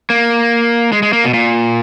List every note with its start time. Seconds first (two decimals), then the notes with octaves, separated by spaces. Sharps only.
0.10 A#3
0.92 G#3
1.03 G#3
1.13 A#3
1.24 B2
1.34 A#2